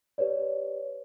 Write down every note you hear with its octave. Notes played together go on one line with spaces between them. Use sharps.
G4 B4 C#5 D5